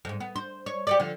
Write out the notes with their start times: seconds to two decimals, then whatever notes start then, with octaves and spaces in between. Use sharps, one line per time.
0.05 F2 G#2
0.20 B3
0.36 C5
0.66 C#5
0.87 G4 C#5 D5
1.00 D3 F3